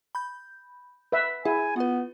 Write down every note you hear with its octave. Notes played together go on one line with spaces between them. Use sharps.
B5 G6
B4 E5
E4 G#4 G#5
B3 F4 B4